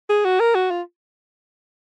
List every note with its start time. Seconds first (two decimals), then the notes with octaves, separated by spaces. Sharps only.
0.10 G#4
0.25 F#4
0.40 A#4
0.55 F#4
0.71 F4